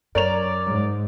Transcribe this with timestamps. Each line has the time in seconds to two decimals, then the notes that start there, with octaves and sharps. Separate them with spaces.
0.15 F#2 A#4 C#5 D5 F7
0.66 G#2